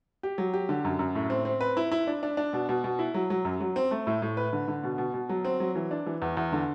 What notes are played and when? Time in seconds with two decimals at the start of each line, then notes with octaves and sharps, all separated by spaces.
0.23 G4
0.38 F#3
0.54 G4
0.69 D3
0.85 F#2
0.99 F#2
1.15 A2
1.30 C4
1.45 C4
1.61 B4
1.77 E4
1.92 E4
2.07 D4
2.23 D4
2.37 D4
2.53 B2
2.69 B2
2.84 B2
2.99 E4
3.14 F#3
3.30 F#3
3.45 F#2
3.60 F#3
3.76 C4
3.91 A3
4.07 A2
4.22 A2
4.37 B4
4.53 D3
4.68 D3
4.84 B2
4.98 B2
5.14 B2
5.29 F#3
5.45 C4
5.60 F#3
5.75 E3
5.91 D4
6.06 E3
6.22 E2
6.37 E2
6.52 D3